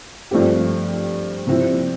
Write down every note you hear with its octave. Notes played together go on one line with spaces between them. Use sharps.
G2 F3 A3 C4 G4
C3 F3 C4 E4